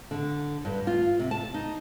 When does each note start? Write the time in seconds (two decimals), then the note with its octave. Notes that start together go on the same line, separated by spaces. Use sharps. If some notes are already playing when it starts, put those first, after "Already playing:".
0.11 D3
0.65 G2
0.87 F4
1.19 C3
1.31 A5
1.54 D#4